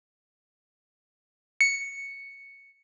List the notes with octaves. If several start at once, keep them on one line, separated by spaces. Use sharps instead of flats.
C#7